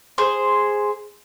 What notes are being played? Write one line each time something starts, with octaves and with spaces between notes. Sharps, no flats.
G#4 C5